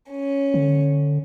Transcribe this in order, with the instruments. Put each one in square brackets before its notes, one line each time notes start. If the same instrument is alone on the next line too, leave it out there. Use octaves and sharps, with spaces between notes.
[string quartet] C#4
[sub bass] D3